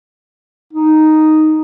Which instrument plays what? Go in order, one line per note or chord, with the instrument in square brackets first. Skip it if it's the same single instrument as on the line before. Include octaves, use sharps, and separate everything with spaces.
[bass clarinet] D#4